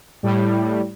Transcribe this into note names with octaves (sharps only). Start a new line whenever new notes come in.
A2 G3